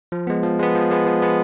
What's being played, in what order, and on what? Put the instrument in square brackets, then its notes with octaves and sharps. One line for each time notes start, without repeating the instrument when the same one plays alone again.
[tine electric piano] F3
G#3 B3
F3
G#3 B3
F3
G#3 B3
F3
G#3 B3